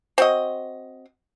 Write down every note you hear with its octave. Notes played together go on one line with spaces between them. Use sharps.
C4 F#4 D#5